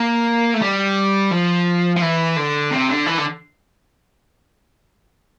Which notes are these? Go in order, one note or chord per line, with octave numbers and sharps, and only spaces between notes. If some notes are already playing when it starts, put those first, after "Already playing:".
Already playing: A#3
A3
G3
F3
F3
E3
D3
C3
D3
E3
D3